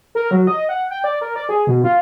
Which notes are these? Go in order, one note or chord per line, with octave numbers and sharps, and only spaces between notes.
A#4
F#3
D#5
F#5
G5
D5
A#4
D5
G#4
B2
F4